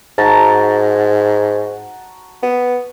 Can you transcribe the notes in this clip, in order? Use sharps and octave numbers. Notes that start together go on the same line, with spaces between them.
G#2 F#4 A5 A#5
B3